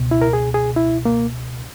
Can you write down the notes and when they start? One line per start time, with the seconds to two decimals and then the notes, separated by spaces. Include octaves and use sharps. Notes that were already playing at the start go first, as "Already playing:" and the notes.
Already playing: C#2 B2
0.11 E4
0.22 A#4
0.33 G#4
0.54 G#4
0.76 E4
1.05 A#3